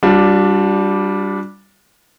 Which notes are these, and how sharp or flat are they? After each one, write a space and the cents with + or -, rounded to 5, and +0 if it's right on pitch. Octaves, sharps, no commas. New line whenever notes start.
G3 +0 D4 -5 F4 +45